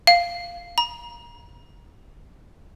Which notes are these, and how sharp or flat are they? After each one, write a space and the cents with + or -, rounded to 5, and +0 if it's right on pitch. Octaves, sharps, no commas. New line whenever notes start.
F5 -5
A#5 +30